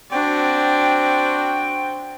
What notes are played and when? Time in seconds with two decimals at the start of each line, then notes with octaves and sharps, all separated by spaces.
0.12 C4 D4 F#4 G5